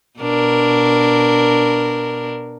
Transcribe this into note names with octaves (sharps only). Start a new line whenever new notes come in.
B2 D4 A#4